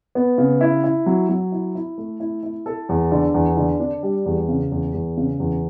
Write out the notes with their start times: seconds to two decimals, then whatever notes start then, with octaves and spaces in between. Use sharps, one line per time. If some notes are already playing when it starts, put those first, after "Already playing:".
0.15 B3
0.38 C#3
0.61 E4
0.84 E4
1.06 F#3
1.29 F#3
1.52 E4
1.75 E4
1.98 A3
2.20 E4
2.43 E4
2.66 A4
2.89 E2
3.12 D3
3.34 E2
3.57 D3
3.80 D4
4.03 G3
4.26 E2
4.48 C#3
4.72 E2
4.94 E2
5.17 C#3
5.40 E2